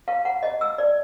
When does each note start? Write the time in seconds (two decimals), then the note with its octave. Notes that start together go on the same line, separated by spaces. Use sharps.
0.08 F5
0.25 F#5
0.43 D#5
0.61 E6
0.78 D5